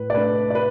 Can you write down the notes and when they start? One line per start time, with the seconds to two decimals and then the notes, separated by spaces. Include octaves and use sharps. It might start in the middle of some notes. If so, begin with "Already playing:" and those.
Already playing: A2 B4
0.10 D5
0.14 A3 D4 B4
0.50 D5
0.55 B4